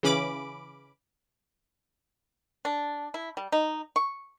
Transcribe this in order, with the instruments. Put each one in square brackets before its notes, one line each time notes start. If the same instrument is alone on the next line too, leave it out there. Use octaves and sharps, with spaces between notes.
[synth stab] C#3 E3 C#4 B5 D6 D7
[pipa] D4
E4
G3
D#4
C#6